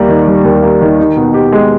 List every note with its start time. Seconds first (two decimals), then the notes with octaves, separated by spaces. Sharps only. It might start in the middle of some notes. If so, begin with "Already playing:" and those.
Already playing: D#2 G3 A#3
0.08 D#3
0.27 G3
0.44 D#2
0.63 A#3
0.81 D#3
0.99 D#4
1.16 B2
1.34 G4
1.52 G#3